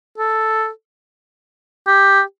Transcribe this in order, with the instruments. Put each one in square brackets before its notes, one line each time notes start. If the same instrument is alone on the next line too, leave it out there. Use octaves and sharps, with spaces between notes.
[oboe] A4
G4